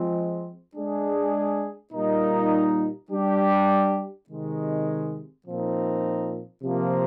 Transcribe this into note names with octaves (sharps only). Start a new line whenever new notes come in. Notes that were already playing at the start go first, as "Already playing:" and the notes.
Already playing: F3 G#3 C4
G#3 D4 G#4
A#2 G3 A#3 D#4
G3 D4 G4
C3 D#3 G#3
A#2 F3 C4 D#4
C3 F3 A#3